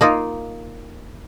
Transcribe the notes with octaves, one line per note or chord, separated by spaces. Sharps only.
A#3 D#4 F4